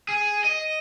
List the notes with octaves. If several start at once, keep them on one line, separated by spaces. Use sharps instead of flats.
G#4
D#5